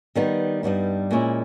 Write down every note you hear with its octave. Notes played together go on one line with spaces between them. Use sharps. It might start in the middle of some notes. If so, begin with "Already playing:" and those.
D#3 G3 B3 D#4
G2 G3 B3 D#4
A#2 G#3 C#4 E4